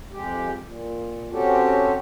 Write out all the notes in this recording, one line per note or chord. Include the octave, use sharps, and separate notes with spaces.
F2 G#3 G4
A#2
C4 C#4 F#4 G4 A4